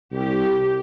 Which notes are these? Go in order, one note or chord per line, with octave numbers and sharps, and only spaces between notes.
C2 G4